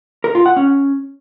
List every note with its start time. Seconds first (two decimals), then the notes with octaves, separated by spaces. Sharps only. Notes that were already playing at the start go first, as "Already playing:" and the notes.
0.24 A#4
0.35 F4
0.46 F#5
0.56 C#4